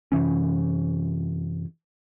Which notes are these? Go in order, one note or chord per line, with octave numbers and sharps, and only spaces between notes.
F#2 C3 E3 C#4